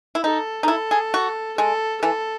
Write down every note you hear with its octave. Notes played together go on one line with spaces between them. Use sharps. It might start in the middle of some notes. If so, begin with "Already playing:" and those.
E4
D#4 A4
D#4
E4 A4
G#4
F#4
G#3 A4
E3 A4